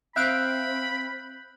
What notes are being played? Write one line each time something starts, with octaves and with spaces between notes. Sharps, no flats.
C4 E5 F5 B5 F#6 G6 D7